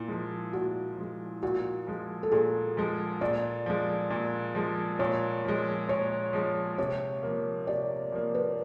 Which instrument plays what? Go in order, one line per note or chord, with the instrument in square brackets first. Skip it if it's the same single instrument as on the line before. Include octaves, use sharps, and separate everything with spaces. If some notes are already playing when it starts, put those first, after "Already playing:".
Already playing: [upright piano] A#2 [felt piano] E4
[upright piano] F3 G#3
[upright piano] A#2 [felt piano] F#4
[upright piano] F3 G#3
[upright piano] A#2 [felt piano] F#4
[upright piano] F3 G#3
[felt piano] A4
[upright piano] A#2 [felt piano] G#4
[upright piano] F3 G#3
[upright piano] A#2 [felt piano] D5
[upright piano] F3 G#3
A#2
F3 G#3
[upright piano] A#2 [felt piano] C#5
[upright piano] F3 G#3
[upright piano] A#2 [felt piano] C#5
[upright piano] F3 G#3
[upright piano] C3 [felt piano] C#5
[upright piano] F3 A#3
[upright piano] C3 [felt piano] D5
[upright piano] F3 A#3
[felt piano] B4